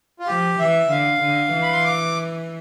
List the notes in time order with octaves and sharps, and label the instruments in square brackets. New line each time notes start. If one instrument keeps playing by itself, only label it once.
[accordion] F4
[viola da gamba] F3 [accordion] G4
[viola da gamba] E3 [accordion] E5
[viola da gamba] D3 [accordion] F5
[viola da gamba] D3
E3
[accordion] B5
C6
D6